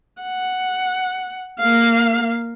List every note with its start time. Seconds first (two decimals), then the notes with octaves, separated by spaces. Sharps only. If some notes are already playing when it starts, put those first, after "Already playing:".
0.22 F#5
1.60 A#3 F5